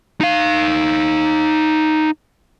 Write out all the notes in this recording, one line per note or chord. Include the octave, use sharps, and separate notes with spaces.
D#4 F5